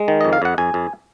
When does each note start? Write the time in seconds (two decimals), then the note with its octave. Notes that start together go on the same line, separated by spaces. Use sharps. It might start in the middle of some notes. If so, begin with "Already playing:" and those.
Already playing: G#3
0.08 D#3
0.21 D#5
0.25 F2
0.33 F5
0.42 F2 F#5
0.58 F2 G#5
0.74 F2